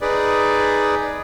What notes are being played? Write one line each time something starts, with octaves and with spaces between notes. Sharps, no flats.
D#4 G#4 B4 D5